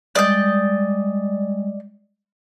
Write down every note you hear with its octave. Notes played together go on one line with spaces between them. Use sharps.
G3 G#3 D5 D#5 G6